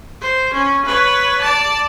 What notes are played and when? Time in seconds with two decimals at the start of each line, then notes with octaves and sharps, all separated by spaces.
0.21 C5
0.54 C#4
0.86 B4 C#5
1.41 D5 A5